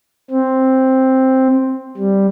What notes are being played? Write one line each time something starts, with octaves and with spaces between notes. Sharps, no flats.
C4
G3